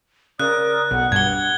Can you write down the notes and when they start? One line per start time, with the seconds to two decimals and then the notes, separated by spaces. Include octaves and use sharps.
0.40 C#3 A#4 D5 D#6 F#6
0.91 B1 F#5
1.12 G2 F#5 G#6 G7